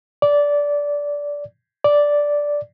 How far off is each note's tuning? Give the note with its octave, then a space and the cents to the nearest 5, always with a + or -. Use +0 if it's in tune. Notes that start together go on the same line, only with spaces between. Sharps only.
D5 -15
D5 -5